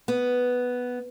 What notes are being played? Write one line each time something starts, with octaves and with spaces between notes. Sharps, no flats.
B3